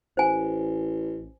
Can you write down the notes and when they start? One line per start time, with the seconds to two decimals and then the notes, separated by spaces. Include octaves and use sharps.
0.17 A1 C5 G#5